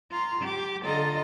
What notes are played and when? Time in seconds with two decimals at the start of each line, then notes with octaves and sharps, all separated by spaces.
0.10 F4 A#5 C6
0.41 G4 D6
0.84 D3 F4 A4 D#5 A#5